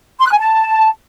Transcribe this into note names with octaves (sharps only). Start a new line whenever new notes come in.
C6
F#6
G#5
A5